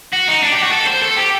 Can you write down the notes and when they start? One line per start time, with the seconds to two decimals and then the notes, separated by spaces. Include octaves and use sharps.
0.13 F#4
0.28 D#4
0.43 D4
0.53 G4
0.64 F#4
0.73 A4
0.88 C5
1.03 A4
1.18 G4